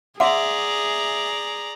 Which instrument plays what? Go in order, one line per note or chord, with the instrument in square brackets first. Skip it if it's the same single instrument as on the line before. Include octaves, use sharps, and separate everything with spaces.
[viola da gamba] G#4 [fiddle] D5 A#5 [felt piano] E5 [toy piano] F#5 C6 D6